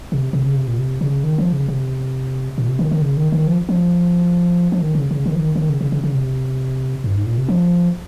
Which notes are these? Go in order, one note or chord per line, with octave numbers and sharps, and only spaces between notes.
C3
C3
C#3
C3
A#2
C3
C#3
D#3
F3
C#3
C3
A#2
C3
D#3
D#3
C#3
D#3
D#3
F3
F3
F3
D#3
C#3
C#3
D#3
F3
D#3
D#3
C#3
C#3
C#3
C#3
C3
G2
G#2
A#2
C3
F3